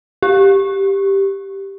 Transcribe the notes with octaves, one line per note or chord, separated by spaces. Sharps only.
G4